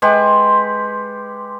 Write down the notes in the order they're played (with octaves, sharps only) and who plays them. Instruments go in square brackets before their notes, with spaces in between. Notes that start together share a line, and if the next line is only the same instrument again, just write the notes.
[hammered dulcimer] G#3 G4 B4 F#5